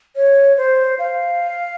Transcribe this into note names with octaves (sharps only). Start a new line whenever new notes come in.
C#5
C5
F5